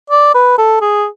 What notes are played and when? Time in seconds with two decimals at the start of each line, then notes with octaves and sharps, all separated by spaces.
0.10 D5
0.34 B4
0.58 A4
0.81 G#4